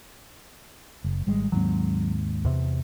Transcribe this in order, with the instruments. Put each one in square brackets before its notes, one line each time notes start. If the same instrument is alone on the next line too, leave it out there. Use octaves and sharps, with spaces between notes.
[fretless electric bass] F#1
G#1 G3 G#3
[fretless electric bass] D#2 G#2 C4 [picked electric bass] F#3
[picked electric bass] E2 C3